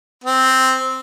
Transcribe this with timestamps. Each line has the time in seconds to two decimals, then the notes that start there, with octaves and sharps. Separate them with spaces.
0.24 C4